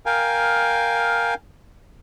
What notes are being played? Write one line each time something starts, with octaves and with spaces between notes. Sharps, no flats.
A#4 F5 G5 G#5